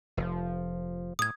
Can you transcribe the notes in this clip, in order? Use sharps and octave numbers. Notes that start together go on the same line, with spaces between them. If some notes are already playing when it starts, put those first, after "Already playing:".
F1 F3
A2 D#6 G#6